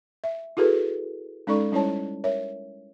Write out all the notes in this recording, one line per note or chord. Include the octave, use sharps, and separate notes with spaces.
E5
E4 F#4 G#4 A4 B4
G#3 C#4 D#4 A4 D5 C#6
G3 C#4 E4 C5 C#5 A5
A#4 C#5 E5